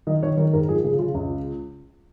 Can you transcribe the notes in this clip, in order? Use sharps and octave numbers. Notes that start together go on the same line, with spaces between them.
D#3 D#5
D#3 C#5
D#3 A#4
G#2 A#4
F3 G#4
C#3 G#4
C#3 F4
C#2